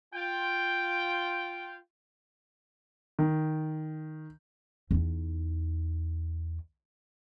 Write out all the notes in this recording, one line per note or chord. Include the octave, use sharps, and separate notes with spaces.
F4 G5
D#3
E2 D#4